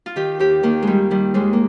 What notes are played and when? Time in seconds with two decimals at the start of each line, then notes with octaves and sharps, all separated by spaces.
0.06 F4
0.16 D#3 G4
0.39 D#2 G4
0.63 D#3 A#3
0.82 D#3 G3 G#3
1.11 D#3 G3
1.34 D#2 G#3
1.53 A#3